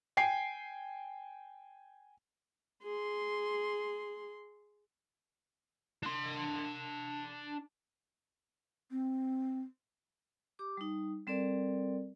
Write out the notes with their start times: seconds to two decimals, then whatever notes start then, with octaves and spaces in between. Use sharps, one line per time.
0.17 G5 G#5 C7
2.84 G#4 C6
6.03 D4 C6
8.91 C4
10.59 G4 D6
10.77 G3 D#4
11.27 G3 C4 A4 A#4 D5